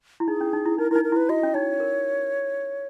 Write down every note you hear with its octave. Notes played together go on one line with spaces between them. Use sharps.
E4
D#4 G#4
C#4
D#4
E4
D#4 A#4
E4 A#4
D#4
A#4
E4
B4
F#4 D#5
C#4
D#4 C#5
A#4